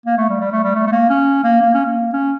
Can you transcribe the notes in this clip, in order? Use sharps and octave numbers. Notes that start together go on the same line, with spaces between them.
A#3
A3
G3
G3
A3
G3
A3
A3
A#3
C#4
A#3
A#3
C#4
A#3
C#4